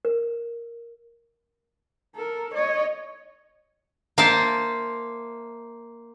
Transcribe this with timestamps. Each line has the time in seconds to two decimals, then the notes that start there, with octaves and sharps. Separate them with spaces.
0.05 A#4
2.16 A4 A#4
2.54 C#5 D#5
4.18 A#3 A#4 C5 E5 A5